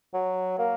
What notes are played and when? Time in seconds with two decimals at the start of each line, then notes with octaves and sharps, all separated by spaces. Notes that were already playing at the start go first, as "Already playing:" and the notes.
0.14 F#3
0.58 A#3